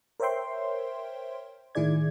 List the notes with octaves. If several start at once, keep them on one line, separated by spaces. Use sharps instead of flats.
A#4 C5 C#5 E5 G5 C6
A2 D#3 E4 G#4 D5 G#6